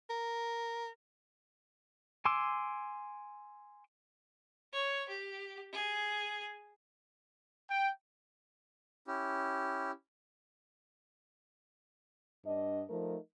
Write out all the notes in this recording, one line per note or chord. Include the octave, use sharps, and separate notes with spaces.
A#4
G#5 C6 D6 E6
C#5
G4
G#4
G5
C#4 E4 G4
G2 D4 D#5
F3 A3 D#4 A#4